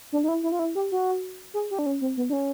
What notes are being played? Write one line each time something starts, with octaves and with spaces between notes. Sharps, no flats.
D4
D#4
E4
E4
F4
E4
G4
F#4
G#4
G4
D4
C#4
C4
B3
D4
C#4